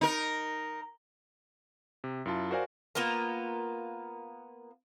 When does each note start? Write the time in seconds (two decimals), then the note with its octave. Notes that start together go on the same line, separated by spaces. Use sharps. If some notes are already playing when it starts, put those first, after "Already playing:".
0.01 D#4 A#4
2.04 C3
2.26 F#2 E4 F4 A5
2.51 F#4 A#4 C5 D5 F5 G#5
2.95 A#3 B3 F4 A#4